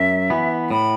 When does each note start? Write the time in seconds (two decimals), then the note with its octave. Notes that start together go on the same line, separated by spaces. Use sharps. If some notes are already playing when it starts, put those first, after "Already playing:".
Already playing: F#2 E5
0.30 E3 B3
0.70 A2 B5